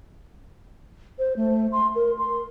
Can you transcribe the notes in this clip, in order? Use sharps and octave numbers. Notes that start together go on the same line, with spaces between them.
C5
A3
C6
A#4
C6